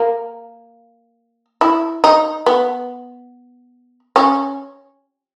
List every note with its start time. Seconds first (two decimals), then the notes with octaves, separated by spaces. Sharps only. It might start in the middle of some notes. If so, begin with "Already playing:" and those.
Already playing: A#3
1.61 E4
2.04 D#4
2.46 B3
4.16 C#4